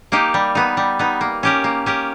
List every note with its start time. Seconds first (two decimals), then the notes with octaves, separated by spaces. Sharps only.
0.12 A#3 D#4 G4
0.34 G3
0.55 B3 D#4
0.77 G3
0.99 B3 D#4
1.21 A#3
1.43 C#4 G4 A#4
1.64 A#3
1.86 C#4 G4 A#4